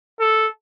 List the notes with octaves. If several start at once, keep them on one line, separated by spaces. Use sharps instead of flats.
A4